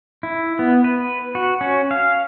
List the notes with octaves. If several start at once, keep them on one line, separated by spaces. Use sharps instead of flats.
E4
B3
B4
F#4
C#4
F5